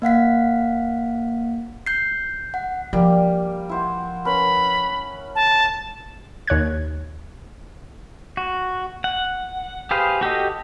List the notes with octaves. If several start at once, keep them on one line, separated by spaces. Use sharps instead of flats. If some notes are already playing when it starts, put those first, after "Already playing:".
A#3 F5 F#5 B6
G6 C7
F#5
F3 G3 A#3 G4
E4 C5 F#5
C#4 A#4 B4 B5
A5
D#2 C#5 F#6 G#6
F#4
F#5
G4 G#4 B4 C5 F5
F#4 G4 A4 D#5